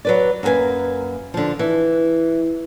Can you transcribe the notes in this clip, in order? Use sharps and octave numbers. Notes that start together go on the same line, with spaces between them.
F#3 B4 D5
F#2 A#3 G#4 B4 G#5
D3 F3
E3